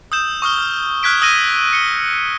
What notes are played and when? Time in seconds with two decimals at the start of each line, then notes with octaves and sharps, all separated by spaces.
0.12 D#6 E6 G6 E7
0.42 C#6 D#6 F6 G7
0.58 F6
1.03 D#6 F6 F#6 G#6 B6 D7
1.21 D#6 E6 G#6 A#6 D#7 G7
1.73 C#7 G7